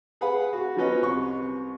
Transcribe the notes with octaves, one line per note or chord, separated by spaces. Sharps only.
G#4 B4 F5 F#5 B5
F#4
F3 F#3 B3 C#4 B4 D#5
C2 C#6